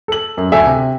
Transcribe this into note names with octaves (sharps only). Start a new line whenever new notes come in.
A4 F#7
F#2
D2 A4 E5 G#5
C3